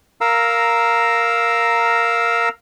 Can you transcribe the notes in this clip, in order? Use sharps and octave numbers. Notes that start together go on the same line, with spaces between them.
A#4 F5 A#5 E6